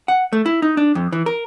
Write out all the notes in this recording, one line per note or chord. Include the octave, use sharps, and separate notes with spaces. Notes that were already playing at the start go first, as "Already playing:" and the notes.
F#5
A3
E4
D#4
D4
F2
E3
A#4